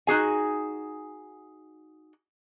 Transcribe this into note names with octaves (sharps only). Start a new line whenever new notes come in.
D#4 F#4 G#4 G#5